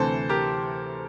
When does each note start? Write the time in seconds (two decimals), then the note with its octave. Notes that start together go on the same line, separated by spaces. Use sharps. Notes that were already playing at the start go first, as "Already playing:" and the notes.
Already playing: D2 C3 E3 A4 C5
0.29 G4 A#4